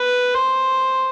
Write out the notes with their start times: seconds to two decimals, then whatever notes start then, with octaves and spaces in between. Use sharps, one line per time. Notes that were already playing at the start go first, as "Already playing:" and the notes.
Already playing: B4
0.35 C5